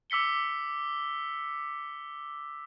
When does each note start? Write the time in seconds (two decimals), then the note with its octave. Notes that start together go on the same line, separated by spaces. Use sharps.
0.10 D6 E6 B6 C#7 G7